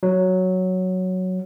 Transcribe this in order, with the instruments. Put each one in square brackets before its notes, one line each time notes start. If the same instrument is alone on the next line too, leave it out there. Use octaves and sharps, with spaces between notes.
[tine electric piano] F#3